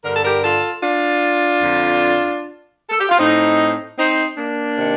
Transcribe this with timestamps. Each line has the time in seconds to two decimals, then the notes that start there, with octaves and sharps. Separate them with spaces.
0.04 G2 D3 A#4
0.14 A4
0.25 G4 A#4
0.43 F4 A4
0.82 D4 F4
1.61 F2 D3
2.90 A4
2.99 G4
3.09 F4
3.19 A2 C4 D#4
3.98 C4 D#4
4.37 A#3 D4
4.77 C3 D#3